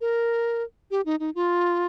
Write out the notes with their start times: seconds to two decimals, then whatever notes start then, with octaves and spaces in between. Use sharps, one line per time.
0.01 A#4
0.91 G4
1.06 D#4
1.20 D#4
1.35 F4